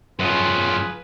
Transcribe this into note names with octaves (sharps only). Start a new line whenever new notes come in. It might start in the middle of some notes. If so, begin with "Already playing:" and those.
F#2 F3 F4 G#4 B4